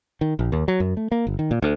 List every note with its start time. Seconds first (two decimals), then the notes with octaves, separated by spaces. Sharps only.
0.21 D#3
0.39 A#1
0.52 D#2
0.68 F#3
0.80 F#2
0.97 A3
1.12 A#3
1.27 G1
1.39 D#3
1.51 A#2
1.62 D2